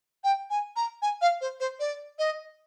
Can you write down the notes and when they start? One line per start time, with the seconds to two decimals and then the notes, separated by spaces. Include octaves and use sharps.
0.24 G5
0.50 G#5
0.76 A#5
1.02 G#5
1.22 F5
1.41 C5
1.60 C5
1.80 D5
2.19 D#5